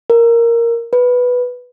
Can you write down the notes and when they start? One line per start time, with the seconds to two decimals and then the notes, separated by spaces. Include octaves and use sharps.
0.10 A#4
0.93 B4